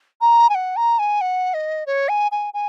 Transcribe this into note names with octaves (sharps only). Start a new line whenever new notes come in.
A#5
G#5
F#5
A#5
G#5
F#5
D#5
C#5
G#5
G#5
G#5